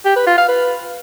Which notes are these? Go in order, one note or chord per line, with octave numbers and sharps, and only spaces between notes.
G4
B4
F4
F5
B4